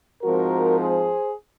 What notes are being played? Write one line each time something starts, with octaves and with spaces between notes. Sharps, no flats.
G#2 F3 C4 F#4 A#4
G#4 C5